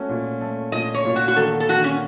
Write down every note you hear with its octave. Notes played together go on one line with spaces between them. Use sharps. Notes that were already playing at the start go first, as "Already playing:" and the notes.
Already playing: A3 C#4 F#4
A#2
A3
A#2 D#5
C#5
A#2
F#4
F#4
D#3 A4
A4
D#3 F#4
C#4